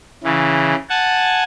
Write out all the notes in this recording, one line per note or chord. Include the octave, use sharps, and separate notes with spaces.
C#3 E3
F#5 G#5 A5